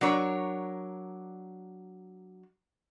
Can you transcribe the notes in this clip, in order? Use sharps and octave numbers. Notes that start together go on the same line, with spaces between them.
F#3 D4 A#4 C#5